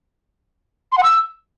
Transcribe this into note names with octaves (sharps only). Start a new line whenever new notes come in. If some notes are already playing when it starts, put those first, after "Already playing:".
C6
F#5
E6